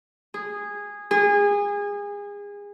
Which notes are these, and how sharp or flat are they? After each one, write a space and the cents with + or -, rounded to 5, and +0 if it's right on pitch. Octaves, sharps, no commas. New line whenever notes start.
G#4 -15
G#4 -30